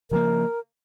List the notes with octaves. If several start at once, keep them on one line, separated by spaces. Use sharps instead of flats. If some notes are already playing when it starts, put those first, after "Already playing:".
C#3 F3 A#3 A#4